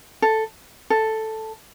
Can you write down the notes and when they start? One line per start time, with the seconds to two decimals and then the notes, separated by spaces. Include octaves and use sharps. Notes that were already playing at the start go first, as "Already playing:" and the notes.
0.22 A4
0.90 A4